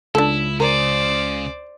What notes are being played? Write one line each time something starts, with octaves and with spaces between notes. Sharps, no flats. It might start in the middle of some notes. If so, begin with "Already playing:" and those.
C#2 D4 E4 A4
C#3 A#4 C5 D5